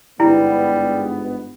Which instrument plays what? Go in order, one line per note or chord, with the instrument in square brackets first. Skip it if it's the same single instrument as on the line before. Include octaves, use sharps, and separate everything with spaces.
[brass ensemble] G1 G#2 B3 [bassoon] G3 [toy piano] E4